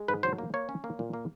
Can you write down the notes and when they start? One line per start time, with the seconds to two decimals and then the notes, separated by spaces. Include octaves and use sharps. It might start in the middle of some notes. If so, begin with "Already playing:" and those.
Already playing: G#3
0.08 G#2 B4
0.23 F#3 C5
0.38 A#3
0.54 A#3 C#5
0.69 C#4
0.84 A#3
0.99 A#2
1.13 A#3